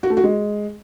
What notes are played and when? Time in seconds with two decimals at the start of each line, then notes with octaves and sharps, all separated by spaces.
0.03 F#4
0.10 A3
0.17 F#4
0.24 G#3